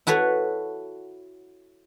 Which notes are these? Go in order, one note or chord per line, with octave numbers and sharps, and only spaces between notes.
E4 F#4 A4 B4 C#5